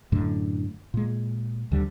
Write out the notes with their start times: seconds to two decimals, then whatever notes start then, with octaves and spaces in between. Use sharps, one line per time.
0.12 F#2 A2 D3
0.94 A#2 G#3
1.72 D2 D3 G3